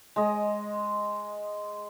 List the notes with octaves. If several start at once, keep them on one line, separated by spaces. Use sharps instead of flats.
G#3 D#5